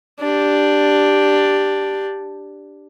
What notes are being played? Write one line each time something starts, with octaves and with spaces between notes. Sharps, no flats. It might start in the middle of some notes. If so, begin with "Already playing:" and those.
D4 G4